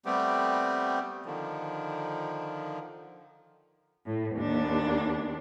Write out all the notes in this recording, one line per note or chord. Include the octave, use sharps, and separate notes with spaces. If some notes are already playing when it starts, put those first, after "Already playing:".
G3 A3 B3 C4 G4
D3 D#3 F3
A2
D#2 D4